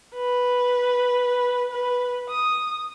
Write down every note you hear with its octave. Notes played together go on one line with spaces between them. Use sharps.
B4
B4
D#6